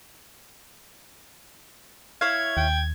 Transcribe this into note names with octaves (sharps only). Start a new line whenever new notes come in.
E4 C#5 F5 G#6
D#2 G5